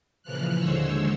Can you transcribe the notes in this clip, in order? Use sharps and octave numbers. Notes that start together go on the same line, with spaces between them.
A#2 C#3 E3 F3 F6 F#6
D#2 D3 G#3 C5 C#5 E6